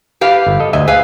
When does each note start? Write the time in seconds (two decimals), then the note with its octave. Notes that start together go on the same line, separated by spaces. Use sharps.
0.21 G4 B4 F5
0.47 G1
0.60 A4 D#5
0.73 D2 D#5 E5 G#5
0.88 G#4 B4 E5 F5 G#5